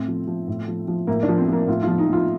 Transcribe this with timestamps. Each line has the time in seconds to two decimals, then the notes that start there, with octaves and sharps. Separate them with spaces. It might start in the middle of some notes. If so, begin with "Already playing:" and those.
Already playing: A2 C4
0.08 F3
0.27 F3
0.48 A2
0.68 F3
0.88 F3
1.07 A2 A#3
1.23 D4
1.28 F3
1.38 C4
1.48 F3 A#3
1.68 A2 F4
1.83 F3 F4
1.98 D#4
2.08 F3
2.13 F4